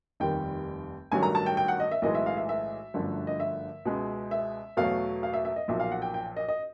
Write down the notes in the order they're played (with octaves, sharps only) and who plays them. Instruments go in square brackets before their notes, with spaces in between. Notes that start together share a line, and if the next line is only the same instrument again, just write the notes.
[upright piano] F1 D#2 D#3 G3 G5
A1 G2 D#3 F#3 A3 G#5
A#5
A5
G5
G5
F#5
D#5
E5
B1 A2 E3 G#3 D#5
E5
F5
E5
E5
G1 F#2 D3 F3 A3
D#5
E5
C#2 B2 G#3
E5
E2 B2 F#3 A3 F5
F5
E5
E5
D#5
B1 A#2 F3 E5
F5
F#5
G5
G5
D#5
D#5